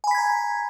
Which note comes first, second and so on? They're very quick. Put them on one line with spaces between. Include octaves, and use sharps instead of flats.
G#5 B5 B6 G#6 A#5